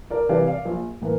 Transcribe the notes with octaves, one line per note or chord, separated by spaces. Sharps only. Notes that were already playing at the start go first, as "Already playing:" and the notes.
A#4 D5
C3 E3 G3 D5 F5
D5 F5
A#1
A2 E3 A#3